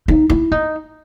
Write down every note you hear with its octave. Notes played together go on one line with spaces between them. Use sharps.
D#4
E4
D#4